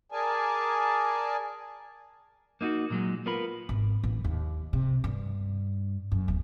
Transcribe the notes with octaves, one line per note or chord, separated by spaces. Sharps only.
G#4 A#4 D5 G#5 A5
A#3 D#4 F4 F#4
A#2 F#3 G#3
B3 F4 A#4 B5
G#1
A1
D#2
C3
G2
F#2
D1